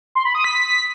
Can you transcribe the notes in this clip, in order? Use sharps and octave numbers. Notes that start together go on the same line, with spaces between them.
C6
B5
D#6
B6